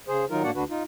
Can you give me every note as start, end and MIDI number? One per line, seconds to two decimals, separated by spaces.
0.08 0.25 49
0.08 0.25 68
0.08 0.25 72
0.30 0.43 51
0.30 0.43 54
0.30 0.43 63
0.30 0.43 65
0.30 0.43 70
0.43 0.51 45
0.43 0.51 58
0.43 0.51 62
0.43 0.51 66
0.43 0.51 74
0.43 0.51 78
0.55 0.64 38
0.55 0.64 50
0.55 0.64 62
0.55 0.64 66
0.55 0.64 71
0.70 0.83 63
0.70 0.83 65